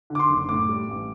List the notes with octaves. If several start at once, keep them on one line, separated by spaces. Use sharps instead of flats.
D3
D6
C6
F#1
A2 D6
G3
A1